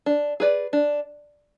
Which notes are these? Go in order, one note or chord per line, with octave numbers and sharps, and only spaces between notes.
D4
G#4 B4 D5
D4